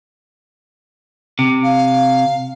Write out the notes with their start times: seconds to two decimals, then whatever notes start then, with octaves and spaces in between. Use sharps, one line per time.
1.39 C3
1.63 F5